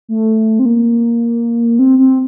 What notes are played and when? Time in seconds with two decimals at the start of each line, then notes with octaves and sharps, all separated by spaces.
0.08 A3
0.59 C4
0.65 A#3
1.79 C4
1.98 C4